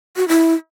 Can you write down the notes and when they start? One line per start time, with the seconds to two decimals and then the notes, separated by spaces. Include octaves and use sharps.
0.17 F#4
0.28 E4